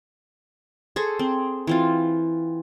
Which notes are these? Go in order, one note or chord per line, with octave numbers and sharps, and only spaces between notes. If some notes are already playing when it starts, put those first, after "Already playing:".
G#4 A4 C5 C#6
C4
E3 C4 F4